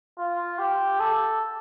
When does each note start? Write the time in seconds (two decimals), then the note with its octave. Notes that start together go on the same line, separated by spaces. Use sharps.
0.19 F4
0.58 G4
1.00 A4